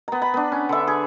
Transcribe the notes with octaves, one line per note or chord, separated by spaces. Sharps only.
B3 A#5
B5
B3 D4
C#4
D3 E5
G#4